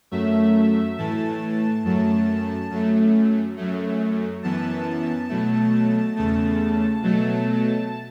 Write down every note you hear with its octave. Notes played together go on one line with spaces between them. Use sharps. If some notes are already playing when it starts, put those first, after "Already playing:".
F#2 F#3 A3 E5
A2 E3 A3 A5
F#2 F#3 A3
F#2 F#3 A3
F#2 F#3 A3
F#2 E3 B3 A5
B2 F#3 A3
E2 C#3 A3 A5
B2 F#3 A3